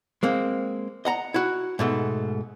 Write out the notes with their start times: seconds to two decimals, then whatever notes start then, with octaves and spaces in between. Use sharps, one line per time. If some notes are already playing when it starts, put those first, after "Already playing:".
0.23 G#3 A#3 C4
1.05 D#5 F#5 A#5
1.34 E4 F#4
1.79 G#2 B2 A3